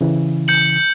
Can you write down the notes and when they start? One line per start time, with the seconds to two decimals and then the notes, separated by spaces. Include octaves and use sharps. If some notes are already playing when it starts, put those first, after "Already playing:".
0.01 C#3 E3
0.48 G6 C#7 F#7